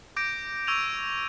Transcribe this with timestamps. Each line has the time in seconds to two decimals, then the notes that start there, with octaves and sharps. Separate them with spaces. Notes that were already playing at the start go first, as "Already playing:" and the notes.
0.16 D6 G6 A#6 D7
0.67 C#6 E6 G#6 D#7 F7